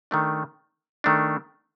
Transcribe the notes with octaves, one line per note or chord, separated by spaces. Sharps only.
D#3 A3 D4
D#3 A3 D4